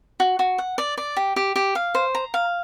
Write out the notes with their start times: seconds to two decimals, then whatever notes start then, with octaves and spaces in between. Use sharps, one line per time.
0.20 F#4
0.39 F#4
0.58 F#5
0.78 D5
0.97 D5
1.16 G4
1.36 G4
1.56 G4
1.75 F5
1.95 C5
2.15 A#5
2.34 F5